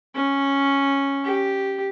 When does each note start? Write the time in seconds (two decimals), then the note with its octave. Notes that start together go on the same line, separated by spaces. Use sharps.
0.15 C#4
1.24 G4